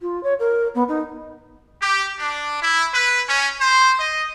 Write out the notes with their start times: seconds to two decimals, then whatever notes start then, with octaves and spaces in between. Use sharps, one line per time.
0.01 F4
0.23 C#5
0.40 A#4
0.75 B3
0.89 D#4
1.82 G4
2.19 D4
2.63 E4
2.94 B4
3.29 C#4
3.61 C5
3.99 D#5